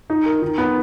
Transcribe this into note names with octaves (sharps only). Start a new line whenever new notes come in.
D#4
A#4
D#3
B3